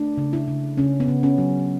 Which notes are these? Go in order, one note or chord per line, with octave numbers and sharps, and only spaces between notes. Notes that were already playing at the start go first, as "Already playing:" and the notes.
Already playing: A3 D4
C#3
E4
C#3
C#3 C#4
B3
C#3
C#4
F#3